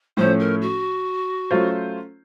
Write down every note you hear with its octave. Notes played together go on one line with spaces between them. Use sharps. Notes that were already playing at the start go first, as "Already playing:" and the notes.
A2 F3 A3 C#4 C5
A#4
F#4
F#3 A3 C#4 F4 C5